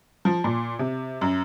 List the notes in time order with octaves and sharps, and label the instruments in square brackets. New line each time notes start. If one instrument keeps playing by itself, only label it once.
[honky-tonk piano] F3
A#2
C3
F#2